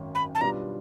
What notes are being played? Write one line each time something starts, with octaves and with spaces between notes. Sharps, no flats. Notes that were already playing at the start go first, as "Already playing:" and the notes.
Already playing: G#1 F#2 D#3
B5
A5
B2 G3 B3 D4 F4 A#5